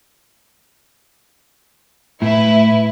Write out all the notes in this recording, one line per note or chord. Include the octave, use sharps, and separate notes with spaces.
A2 E4 B4